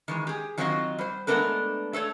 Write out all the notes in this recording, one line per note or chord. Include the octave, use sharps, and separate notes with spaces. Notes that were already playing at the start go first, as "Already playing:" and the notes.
D#3 E3 G#3
G4 G#4
D#3 F#3 C4 F4 F#4 D#5
G3 C5
G#3 A3 B3 D4 A#4 B4
A3 A4 C5 C#5